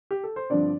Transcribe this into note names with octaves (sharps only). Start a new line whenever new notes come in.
G4
A4
C5
G2 D3 F3 C4 D4 D5